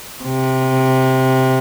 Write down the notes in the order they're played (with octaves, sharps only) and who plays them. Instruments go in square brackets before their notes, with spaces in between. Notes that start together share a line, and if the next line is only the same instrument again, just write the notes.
[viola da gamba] C3